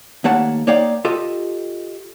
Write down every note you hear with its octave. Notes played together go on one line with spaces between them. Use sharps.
D#2 A3 A#3 C#5 F#5 A5
A#3 D#4 C#5 D5 F5 G5
F4 G4 A4 D#5